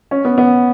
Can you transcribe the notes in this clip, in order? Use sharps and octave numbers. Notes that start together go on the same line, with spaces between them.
C#4
B3
B3